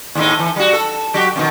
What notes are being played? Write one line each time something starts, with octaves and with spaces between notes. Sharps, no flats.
D#2 A2 D#4
E3
G3 F#4
A4
F#3 F#4 G4
F2 B2 D#3